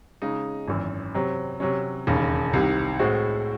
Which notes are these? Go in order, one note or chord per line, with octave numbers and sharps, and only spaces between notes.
C#3 G#3 D#4
G#1 F#2 E3
C3 F#3 C4
C3 F#3 C#4
E1 D#2 C#3
C2 C3 D#3
A2 G#3 C4 F#4